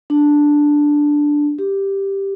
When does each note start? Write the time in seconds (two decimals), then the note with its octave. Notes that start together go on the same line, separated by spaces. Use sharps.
0.10 D4
1.59 G4